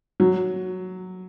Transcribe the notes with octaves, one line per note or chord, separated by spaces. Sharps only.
F#3